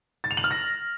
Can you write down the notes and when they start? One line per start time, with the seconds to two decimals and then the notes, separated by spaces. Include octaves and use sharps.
0.24 A6
0.31 F7
0.37 F#7
0.44 F6
0.51 A#6